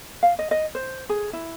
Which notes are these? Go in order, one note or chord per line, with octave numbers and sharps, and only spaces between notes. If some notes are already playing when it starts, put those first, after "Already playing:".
F5
D#5
D#5
C5
G#4
E4